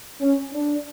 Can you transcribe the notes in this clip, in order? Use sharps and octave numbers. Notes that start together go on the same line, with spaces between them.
C#4
D4